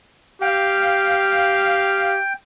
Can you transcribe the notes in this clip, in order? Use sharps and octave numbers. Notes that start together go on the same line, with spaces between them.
G4 F5 G5